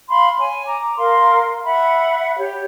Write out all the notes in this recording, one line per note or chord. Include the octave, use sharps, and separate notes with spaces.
F5 B5 C6
C#5 G#5
A#5 D6
A#4 F5 C6
E5 F#5 B5
G4 C#5